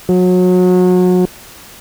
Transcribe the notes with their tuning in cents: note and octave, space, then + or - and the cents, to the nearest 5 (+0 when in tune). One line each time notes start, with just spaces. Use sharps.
F#3 -30